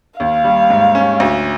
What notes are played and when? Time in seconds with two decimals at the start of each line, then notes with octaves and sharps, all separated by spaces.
0.20 D#2 F5
0.44 G3
0.70 G#2
0.95 C#4
1.20 D2